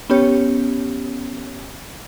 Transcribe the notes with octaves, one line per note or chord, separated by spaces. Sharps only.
B3 C#4 G4 C#5